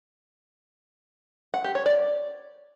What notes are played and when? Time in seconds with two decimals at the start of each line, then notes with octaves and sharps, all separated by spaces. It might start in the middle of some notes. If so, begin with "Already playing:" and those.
1.54 F#5
1.64 G4
1.75 C#5
1.86 D5